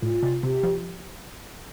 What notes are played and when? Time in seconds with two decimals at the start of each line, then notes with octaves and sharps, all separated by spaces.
0.02 A2 F4
0.22 C3
0.43 C3 G4
0.63 F3